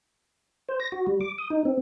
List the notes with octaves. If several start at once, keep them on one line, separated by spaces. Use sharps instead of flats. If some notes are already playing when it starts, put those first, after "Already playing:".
C5
A#6
F#4
G3
D6
D#6
D#4
C4